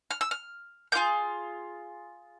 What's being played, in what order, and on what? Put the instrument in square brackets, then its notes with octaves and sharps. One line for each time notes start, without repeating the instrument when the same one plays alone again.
[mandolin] F6
E6
F6
A#3 F4 G#4 G6